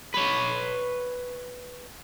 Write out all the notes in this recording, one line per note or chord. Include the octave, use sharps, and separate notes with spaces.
B4 C#5